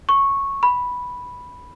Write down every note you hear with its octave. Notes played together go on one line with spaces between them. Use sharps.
C#6
B5